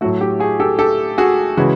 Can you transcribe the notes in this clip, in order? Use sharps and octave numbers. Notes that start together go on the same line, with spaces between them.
A2 F#3 A3 F#4
G4
F#4 G#4
G4 A4
G4 A4
F#4 G#4
C#3 E3 G#3 F#4